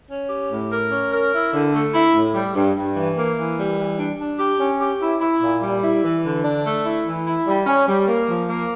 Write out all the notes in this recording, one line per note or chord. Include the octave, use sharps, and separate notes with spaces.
C#4
G4
A2
A#4
C#4
A#4
E4
D3
A3
E4
A2
G3
G2
G2
E3
A#3
E3
G3
E3
D4
D4
G4
C#4
G4
E4
E4
A#2
G3
E4
E3
D3
D4
A3
E4
E3
E4
G3
C#4
G3
A#3
F3
A#3